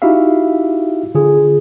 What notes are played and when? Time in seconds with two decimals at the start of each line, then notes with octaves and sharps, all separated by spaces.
0.02 D#4 E4 F#4 G4 E5 F5
1.15 D3 F4 G#4